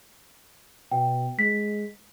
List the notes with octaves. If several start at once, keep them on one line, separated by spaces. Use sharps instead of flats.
B2 G5
G#3 B6